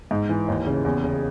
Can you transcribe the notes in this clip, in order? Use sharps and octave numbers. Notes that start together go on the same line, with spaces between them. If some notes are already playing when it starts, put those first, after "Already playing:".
G#2
E3
D#2
C#3
E2
C#3